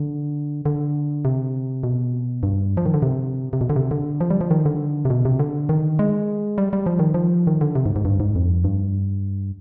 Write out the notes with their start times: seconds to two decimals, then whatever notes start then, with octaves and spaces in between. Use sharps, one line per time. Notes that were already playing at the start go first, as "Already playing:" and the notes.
Already playing: D3
0.66 D3
1.25 C3
1.84 B2
2.43 G2
2.77 F3
2.86 D#3
2.94 D3
3.02 C3
3.53 C3
3.61 B2
3.70 D3
3.76 C3
3.91 D3
4.20 F3
4.30 G3
4.41 F3
4.51 D#3
4.65 D3
5.05 C3
5.10 B2
5.25 C3
5.40 D3
5.69 D#3
5.99 G#3
6.58 G3
6.73 G3
6.86 F3
6.99 D#3
7.14 F3
7.47 D#3
7.61 D3
7.75 C3
7.86 G#2
7.96 G#2
8.05 G2
8.20 G#2
8.35 F2
8.64 G2